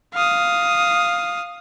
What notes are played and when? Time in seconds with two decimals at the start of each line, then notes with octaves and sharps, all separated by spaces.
0.14 F5 D#6